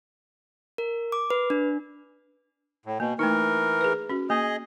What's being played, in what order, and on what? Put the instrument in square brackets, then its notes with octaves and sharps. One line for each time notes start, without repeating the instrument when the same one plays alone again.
[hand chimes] A#4
D6
B4
D4
[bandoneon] A2
[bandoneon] B2 [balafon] A#3
[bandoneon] E3 A#4 [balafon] A3 D#4
[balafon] G#4 B4
C#4 F#4
[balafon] A#3 [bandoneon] G#4 D#5